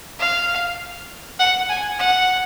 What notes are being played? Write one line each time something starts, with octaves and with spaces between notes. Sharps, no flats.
F5
F#5
G#5
F#5